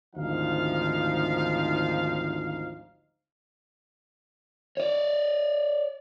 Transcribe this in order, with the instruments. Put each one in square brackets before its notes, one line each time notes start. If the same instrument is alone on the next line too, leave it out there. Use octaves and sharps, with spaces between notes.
[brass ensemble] G#1 D2 F3 D#4 F5
[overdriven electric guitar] C#5 D5